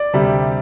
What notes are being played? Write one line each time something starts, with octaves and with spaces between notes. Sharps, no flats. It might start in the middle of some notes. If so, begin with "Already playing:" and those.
Already playing: D5
D2 C3 G3